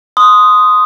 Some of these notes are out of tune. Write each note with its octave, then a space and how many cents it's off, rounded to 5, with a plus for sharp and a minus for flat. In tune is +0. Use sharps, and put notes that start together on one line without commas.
C6 -15 D#6 +0